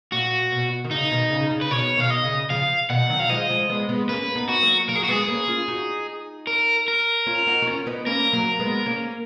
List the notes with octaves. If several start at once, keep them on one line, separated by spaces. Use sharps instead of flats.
A#2 F#4
B2
D#3
C#3 D#4
B2 D#3
C#3
C#3
B4
B2 D#3 C#5
B2 D#3 F5
D#5
C#3
C#3 F3 F5
B2 D#3 F#5
D#3 F#3
F5
F3 G#3 D#5
F3 G#3
G#3 B3
G#3 B3
A#3 C#4 B4
B3 D#4
F#4
F#3 A#3
F#3 A#3 A#4
G#4
F#4
G#3 B3 G#4
A#3 C#4
C#4 F4
D#4 F#4
A#4
A#4
C#4 F4
D#4 F#4
F#4
C#4 F4
B3 D#4
A#3 C#4 A#4
F#3 A#3
G#3 B3
A#3 C#4